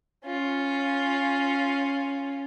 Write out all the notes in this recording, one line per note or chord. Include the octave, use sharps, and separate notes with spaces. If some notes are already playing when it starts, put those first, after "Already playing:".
C#4 F4